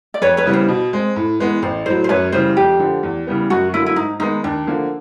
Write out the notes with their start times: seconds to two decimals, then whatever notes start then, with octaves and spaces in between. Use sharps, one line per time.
0.14 D5
0.22 F2 B4 C#5
0.37 B4 C#5
0.46 C#3 E3 G3 B3
0.53 C5
0.69 B2
0.93 G#3 C4
1.16 A2
1.39 E3 G#3 B3
1.62 A1 C5
1.86 A2 F#3 C5
2.04 C5
2.09 F#2 B4 C#5
2.32 C#3 E3 G3 C5
2.57 F2 G4
2.80 D3 F3
3.03 E2
3.27 C#3 E3 G3 B3
3.50 F#2 F#4
3.73 D3 F#3 A#3 E4
3.86 E4
3.96 G#2 D#4
4.20 D#3 G#3 B3 D#4
4.44 D#2 D4
4.67 D3 F3 A#3